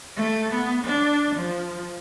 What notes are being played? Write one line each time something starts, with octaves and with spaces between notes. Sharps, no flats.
A3
B3
D4
F3